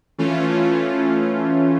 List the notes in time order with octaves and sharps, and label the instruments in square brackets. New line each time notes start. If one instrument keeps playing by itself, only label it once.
[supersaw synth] E3 A3 C#4 F4